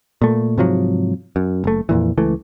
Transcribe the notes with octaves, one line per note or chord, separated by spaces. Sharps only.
A#2 A3
G#2 C3 F3 F#3
F#2
F#1 A3
F2 A#2 E3
C#2 E3 A3